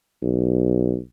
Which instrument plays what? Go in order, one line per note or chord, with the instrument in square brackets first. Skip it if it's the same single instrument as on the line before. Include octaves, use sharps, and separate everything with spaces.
[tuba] B1